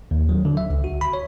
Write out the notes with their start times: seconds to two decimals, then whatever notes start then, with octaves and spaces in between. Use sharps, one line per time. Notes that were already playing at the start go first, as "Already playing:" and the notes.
0.11 D#2
0.29 F#3
0.45 D3
0.57 E5
0.70 C#2
0.84 F#4
1.01 B5
1.13 C#5